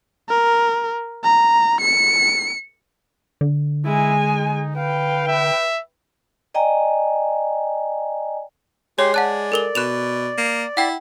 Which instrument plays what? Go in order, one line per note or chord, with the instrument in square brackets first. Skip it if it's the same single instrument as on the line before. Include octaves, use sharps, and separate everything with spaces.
[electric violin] A#4
A#5
C#7
[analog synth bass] D3
[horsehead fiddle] G#3 G#5 [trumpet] E4
[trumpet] D#4
[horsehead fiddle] B4 G5 [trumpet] F5
[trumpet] E5
[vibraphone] D5 D#5 G5 G#5 A#5
[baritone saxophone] G#3 [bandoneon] G4 C6 [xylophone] C#5
[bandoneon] D5 [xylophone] F#5 A5 F#6
[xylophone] A4 A#4 G7
[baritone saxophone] B2 [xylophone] F#6 E7 F7
[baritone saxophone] A#3
[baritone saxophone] E4 [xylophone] F#5 G5